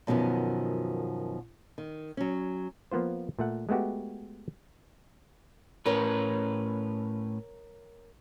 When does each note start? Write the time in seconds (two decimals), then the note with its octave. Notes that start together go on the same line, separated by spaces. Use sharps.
0.07 F#2 B2 D#3 F3 B3
1.78 D#3
2.17 F#3 C#4
2.92 F3 A#3 B3 F4 C5
3.39 A#2 A3 F#5
3.69 G#3 A3 B3 F#4 G4
5.86 A2 C#4 A#4 B4 C#5